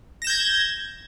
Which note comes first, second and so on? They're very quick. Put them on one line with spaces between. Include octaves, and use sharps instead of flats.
A#6 E7 G6 G#6